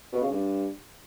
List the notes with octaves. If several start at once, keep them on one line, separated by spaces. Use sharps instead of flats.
B2
C#3
G2